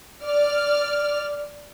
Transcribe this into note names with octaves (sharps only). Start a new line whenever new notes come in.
D5 F6